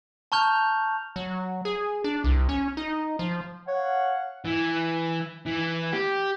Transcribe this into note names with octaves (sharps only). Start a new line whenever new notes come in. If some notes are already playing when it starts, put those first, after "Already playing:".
A5 A#5 C#6 F6 G6 F7
F#3
G#4
D4
C2
C#4
D#4
F3
C#5 F5 F#5
E3
E3
G4